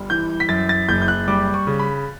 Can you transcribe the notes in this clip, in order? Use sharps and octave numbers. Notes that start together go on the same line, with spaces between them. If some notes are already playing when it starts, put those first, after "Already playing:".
Already playing: G1 G3
E3 G6
B6
F#2 A6
A6
F#1 G6
G6
F#6
G3 D6
C#6
C#3
B5